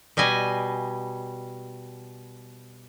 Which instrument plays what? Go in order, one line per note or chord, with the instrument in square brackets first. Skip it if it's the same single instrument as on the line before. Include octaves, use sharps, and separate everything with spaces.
[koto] B2 G3 D#5 G#5